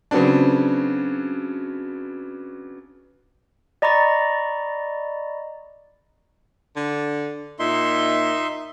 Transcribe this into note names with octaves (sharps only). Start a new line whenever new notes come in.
C#3 F#3 B3 C4 D4
D5 D#5 A#5 B5 C#6 A6
D3
A#2 D#4 E5 C6